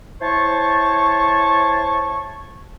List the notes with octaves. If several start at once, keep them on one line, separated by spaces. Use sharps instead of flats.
E4 C5 C#5 A5 C#6